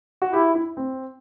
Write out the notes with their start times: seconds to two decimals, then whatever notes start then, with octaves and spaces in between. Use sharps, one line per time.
0.22 F#4
0.33 E4 G4
0.55 E4
0.77 C4